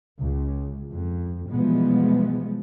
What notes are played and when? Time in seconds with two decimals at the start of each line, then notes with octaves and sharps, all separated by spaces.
0.20 C#2
0.92 F2
1.49 B2 E3 F3 G3 G#3 B3